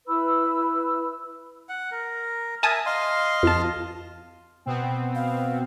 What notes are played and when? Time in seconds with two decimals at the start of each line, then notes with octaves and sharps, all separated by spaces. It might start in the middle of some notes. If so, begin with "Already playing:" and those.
0.07 E4 B4 B5 E6
1.69 F#5
1.91 A#4
2.63 A#4 E5 G#5 A5 D#6
2.86 D#5 F5 C6
3.43 F2 A5
4.66 B2 B3 C4
5.15 F5